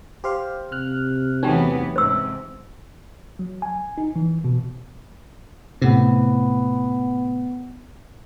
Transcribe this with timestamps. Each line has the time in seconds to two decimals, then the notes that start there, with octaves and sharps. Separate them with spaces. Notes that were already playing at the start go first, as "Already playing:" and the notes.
0.24 G4 C5 F5
0.72 C3 F6 F#6
1.43 E2 E3 F#3 A3 B3 C#4 D#4 G5
1.96 G#2 C3 C5 E6
3.39 F#3
3.62 G#5
3.98 D#4
4.16 E3
4.44 B2
5.82 A2 C3 B3